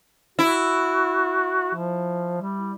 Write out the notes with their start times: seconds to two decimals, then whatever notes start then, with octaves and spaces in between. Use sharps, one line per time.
0.39 E4 F#4
1.75 F3
2.41 G3